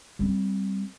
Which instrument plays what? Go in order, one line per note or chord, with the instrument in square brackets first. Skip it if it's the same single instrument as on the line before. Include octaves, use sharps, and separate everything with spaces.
[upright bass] G3 C4